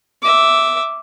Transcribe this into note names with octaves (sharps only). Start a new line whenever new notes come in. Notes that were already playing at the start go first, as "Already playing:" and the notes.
E5 D6